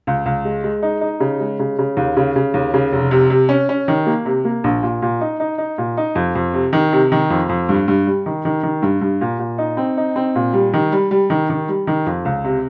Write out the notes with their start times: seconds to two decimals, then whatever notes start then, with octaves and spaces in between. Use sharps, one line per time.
0.07 C#2
0.26 C#2
0.45 G#3
0.64 G#3
0.83 D#4
1.01 D#4
1.20 C#3
1.40 G#3
1.60 C#3
1.79 C#3
1.97 D#2
2.17 C#3
2.36 C#3
2.54 D#2
2.74 C#3
2.93 F1
3.11 C3
3.30 C3
3.49 C#4
3.69 C#4
3.88 D#3
4.07 A#3
4.26 C3
4.45 A#3
4.64 A#1
4.83 A#2
5.02 A#2
5.21 D#4
5.40 D#4
5.58 D#4
5.78 A#2
5.97 D#4
6.15 F2
6.35 F2
6.54 C3
6.73 D#3
6.92 C3
7.12 D#3
7.30 F2
7.49 F2
7.69 G2
7.88 G2
8.07 G3
8.26 D#3
8.45 D#3
8.63 D#3
8.82 G2
9.01 G2
9.21 A#2
9.39 A#2
9.58 D#4
9.77 C4
9.97 D#4
10.16 C4
10.35 A#2
10.53 G3
10.74 D#3
10.92 G3
11.11 G3
11.30 D#3
11.50 D#3
11.68 G3
11.87 D#3
12.06 F2
12.25 C#2
12.45 C3